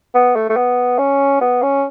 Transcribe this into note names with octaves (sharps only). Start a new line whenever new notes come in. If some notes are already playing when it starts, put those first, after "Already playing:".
B3
A3
A3
B3
C#4
B3
C#4